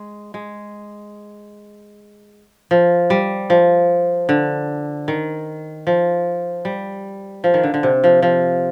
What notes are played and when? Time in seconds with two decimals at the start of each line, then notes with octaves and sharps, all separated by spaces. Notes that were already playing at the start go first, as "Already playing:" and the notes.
Already playing: G#3
0.34 G#3
2.71 F3
3.10 G3
3.50 F3
4.29 D3
5.08 D#3
5.87 F3
6.65 G3
7.44 F3
7.54 D#3
7.63 D3
7.74 D3
7.83 C3
8.04 F3
8.22 F3